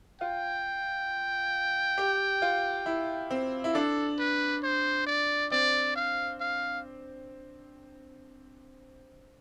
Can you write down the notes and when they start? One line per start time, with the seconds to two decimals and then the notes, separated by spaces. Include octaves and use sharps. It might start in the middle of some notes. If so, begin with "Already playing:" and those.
0.21 F4 G5
1.98 G4
2.42 F4
2.86 E4
3.30 C4
3.64 E4
3.74 D4 A4
4.19 B4
4.63 C5
5.07 D5
5.51 C4 D5
5.96 F5
6.40 F5